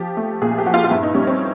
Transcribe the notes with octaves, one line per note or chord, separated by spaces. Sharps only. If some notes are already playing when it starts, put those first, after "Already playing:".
Already playing: F3 G4
A3
A#2 G#4
G4
F3 F#4
F4
F4
G2 E4
D#4
G3 C#4
C4